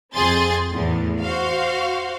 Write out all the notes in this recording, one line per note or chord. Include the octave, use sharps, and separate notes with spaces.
F2 C4 G#4 C6 A6
E2 A2
F#4 C5 F5